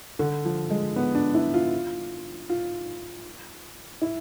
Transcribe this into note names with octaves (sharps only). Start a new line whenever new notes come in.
D3
F3
G#3
B3
D4
E4
F4
F4
E4